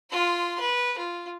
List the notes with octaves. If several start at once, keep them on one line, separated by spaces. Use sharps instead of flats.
F4 C6
B4
F4